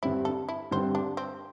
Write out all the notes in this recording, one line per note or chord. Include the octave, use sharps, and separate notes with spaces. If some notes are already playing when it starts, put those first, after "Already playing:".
G2 D3 G3 C4 E4
A4
E4
G2 D3 G3 C4 C5
D4
C4